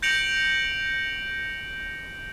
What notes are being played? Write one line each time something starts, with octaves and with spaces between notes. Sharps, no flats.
G6 A#6 C#7 D7 F7 F#7